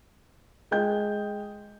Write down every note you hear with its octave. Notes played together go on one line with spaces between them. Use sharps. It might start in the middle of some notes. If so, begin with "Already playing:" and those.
G#3 D#5 G5 G6